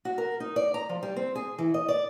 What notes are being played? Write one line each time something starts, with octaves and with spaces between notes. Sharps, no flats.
F#4
A#4
D#4
D5
A#5
F3
G3
C4
G#4
E3
D#5
D5